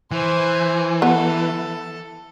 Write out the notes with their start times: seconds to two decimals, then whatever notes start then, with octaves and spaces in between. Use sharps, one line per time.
0.12 E3 C5 G#5
1.02 B3 A4